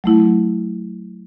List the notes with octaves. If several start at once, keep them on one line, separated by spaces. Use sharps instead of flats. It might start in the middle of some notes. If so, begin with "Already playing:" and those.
F#3 A3 E4